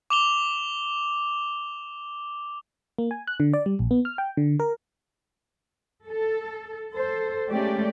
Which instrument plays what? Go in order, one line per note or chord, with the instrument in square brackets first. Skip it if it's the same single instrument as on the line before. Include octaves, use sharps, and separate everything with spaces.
[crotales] D6 F7 G7
[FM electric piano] A#3
G#5
F#6
D3
D5
G3
A#1
B3
F6
G5
D3
A#4
[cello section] A4
A4 C5
G#3 A3 C#4 G4 D5